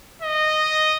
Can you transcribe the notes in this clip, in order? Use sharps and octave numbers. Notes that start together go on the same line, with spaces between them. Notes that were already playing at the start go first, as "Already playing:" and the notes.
D#5